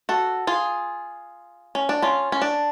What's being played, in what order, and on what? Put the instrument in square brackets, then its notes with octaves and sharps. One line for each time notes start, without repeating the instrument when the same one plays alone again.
[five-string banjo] F#4 A4
F4 G#4
C#4
D4
C#4 F4
C#4
D4